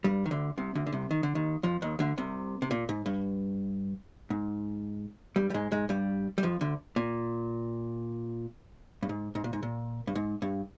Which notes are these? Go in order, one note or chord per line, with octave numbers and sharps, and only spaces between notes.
G2 G3
D#3
D2 D3
C2 C3
D2 D3
D3
C2 C3
D#3
D3
D#2 D#3
F2 F3
D#2 D#3
D2 D3
C2 C3
C3
A#2
G#2
G2
G#2
G2 G3
G3
G#2 G#3
G#2 G#3
G2 G3
G3
F2 F3
D2 D3
A#2
G2
G#2
G#2
A#2
G#2
A#2
G2
G#2
G2